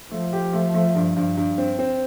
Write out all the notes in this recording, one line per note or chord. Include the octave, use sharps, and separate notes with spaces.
F3 A3
G4
A3
A3
G2
G2
G2
C4
C4